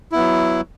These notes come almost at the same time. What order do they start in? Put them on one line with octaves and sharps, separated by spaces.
E4 B3 F#3